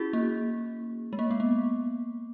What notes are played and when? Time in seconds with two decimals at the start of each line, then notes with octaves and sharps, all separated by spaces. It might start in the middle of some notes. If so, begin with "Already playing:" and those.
Already playing: C#4 E4 F#4 G#4
0.13 A#3
1.13 G#3
1.19 A#3
1.31 B3
1.40 A#3